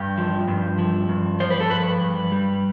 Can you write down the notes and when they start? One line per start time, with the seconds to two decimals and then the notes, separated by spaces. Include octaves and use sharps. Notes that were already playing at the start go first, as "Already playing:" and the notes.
Already playing: G2 G4
0.18 F3
0.48 G2
0.78 F3
1.09 G2
1.40 F3 C5
1.50 B4
1.61 A4
1.70 G2 B4
2.01 G2
2.32 G3